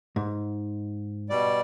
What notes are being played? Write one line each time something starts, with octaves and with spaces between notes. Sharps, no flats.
G#2
B2 G3 D5